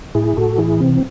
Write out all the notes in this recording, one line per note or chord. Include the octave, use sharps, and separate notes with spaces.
A2 E4 G#4
A2 F#4 A4
E3 E4 G#4
C3 C4